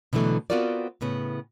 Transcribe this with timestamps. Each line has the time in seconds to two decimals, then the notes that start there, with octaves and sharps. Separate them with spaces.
0.13 B2 D3 E3 F#3 A3
0.50 B3 C4 F4 F#4 A#4 D5
1.01 A2 C#3 B3